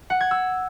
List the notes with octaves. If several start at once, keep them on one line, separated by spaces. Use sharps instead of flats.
F#5
G#6
E6